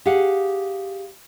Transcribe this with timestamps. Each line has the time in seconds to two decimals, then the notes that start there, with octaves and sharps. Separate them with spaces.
0.06 G4 G#4 F5 F#5